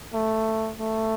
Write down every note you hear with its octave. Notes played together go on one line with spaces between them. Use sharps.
A3
A3